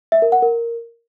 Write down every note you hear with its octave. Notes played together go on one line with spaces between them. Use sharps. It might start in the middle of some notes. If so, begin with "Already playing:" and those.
E5
A#4
F#5
A#4